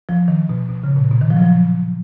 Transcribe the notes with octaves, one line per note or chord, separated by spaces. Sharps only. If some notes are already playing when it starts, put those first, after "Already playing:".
F3
D#3
B2
B2
C#3
B2
A#2
B2
D#3
F3
F#3
F3